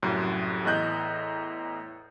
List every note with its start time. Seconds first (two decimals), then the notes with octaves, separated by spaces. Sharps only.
0.03 C2 F#2 A2
0.65 E2 A2 D#5 F#6 G6